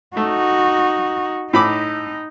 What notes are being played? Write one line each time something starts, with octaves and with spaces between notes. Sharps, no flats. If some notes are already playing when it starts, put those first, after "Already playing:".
A3 D#4 F#4
A2 D#4 B5 D6